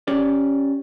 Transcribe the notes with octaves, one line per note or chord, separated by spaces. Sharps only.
C#4 G4 D5